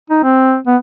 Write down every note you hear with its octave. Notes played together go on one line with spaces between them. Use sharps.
D#4
C4
B3